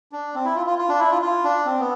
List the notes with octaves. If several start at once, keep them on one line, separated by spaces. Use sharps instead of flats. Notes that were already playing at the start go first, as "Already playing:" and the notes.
D4
C4
E4
F4
F4
F4
D4
E4
F4
F4
D4
C4
B3